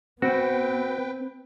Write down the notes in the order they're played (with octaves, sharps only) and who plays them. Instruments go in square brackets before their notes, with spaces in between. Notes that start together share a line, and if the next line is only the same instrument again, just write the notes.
[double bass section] B3 [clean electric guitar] C4 [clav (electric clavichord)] F#4 [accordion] B4 G5